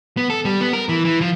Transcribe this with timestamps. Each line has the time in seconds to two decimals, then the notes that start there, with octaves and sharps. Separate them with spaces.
0.17 B3
0.30 A4
0.45 G3
0.60 B3
0.73 A#4
0.89 E3
1.05 E3
1.21 F3